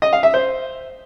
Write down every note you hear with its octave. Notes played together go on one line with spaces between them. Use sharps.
D#5
F5
E5
C5